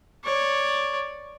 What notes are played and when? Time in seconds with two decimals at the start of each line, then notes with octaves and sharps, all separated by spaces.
0.24 C#5 D5